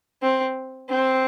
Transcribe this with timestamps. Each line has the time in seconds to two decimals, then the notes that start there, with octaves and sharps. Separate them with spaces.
0.22 C4
0.89 C4